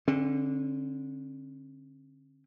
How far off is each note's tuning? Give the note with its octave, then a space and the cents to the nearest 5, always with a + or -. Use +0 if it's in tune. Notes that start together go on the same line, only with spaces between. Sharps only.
D3 -10 C4 +45